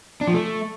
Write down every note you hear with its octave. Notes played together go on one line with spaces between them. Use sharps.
D4
F3
A3